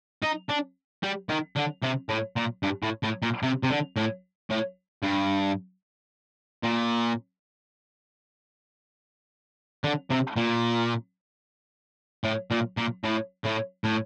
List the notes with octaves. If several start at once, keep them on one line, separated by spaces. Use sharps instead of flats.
D#4
D4
G3
D#3
D3
C3
A2
A#2
G2
A2
A2
A#2
C3
C3
D3
A2
A2
G2
A#2
D3
C3
A#2
A2
A#2
A#2
A2
A2
A2